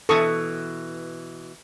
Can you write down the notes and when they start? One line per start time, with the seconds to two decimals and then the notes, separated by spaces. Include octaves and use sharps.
0.09 B2 E3 A4 C#6 D#6